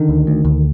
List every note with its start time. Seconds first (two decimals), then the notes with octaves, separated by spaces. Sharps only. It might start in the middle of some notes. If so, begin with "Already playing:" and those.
Already playing: D3 D#3
0.09 D2
0.27 D2
0.45 D2